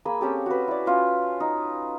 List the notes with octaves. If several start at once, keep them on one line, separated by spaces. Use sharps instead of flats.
A#3 G#4 B5
C4 C#4 G4 A4
F#4 B4
E4 D5
C#4 F4 C#5
D#4